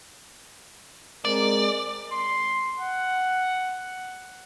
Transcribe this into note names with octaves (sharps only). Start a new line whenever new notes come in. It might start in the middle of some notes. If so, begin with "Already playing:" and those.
G#3 C4 A#4 D5
C6
F#5